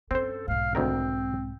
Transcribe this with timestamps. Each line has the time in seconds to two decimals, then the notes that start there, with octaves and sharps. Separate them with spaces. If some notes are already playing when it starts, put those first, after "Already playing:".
0.11 G2 C4 C#4 A4 C5
0.48 B1 G#2 F5
0.75 D2 D#3 C4 A#4